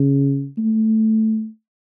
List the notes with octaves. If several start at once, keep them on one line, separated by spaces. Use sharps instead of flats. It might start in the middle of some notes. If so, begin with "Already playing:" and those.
Already playing: C#3
A3